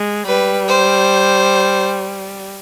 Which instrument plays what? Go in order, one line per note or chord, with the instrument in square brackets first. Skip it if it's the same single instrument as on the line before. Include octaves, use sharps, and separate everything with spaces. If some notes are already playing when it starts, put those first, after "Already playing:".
Already playing: [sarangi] G#3
[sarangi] G3 [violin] B4
[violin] C5